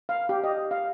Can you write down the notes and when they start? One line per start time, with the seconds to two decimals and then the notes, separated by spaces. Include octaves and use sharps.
0.09 F5
0.29 G4
0.44 D#5
0.71 F5